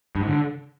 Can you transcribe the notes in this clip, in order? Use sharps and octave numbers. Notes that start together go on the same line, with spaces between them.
G2
G#2
D3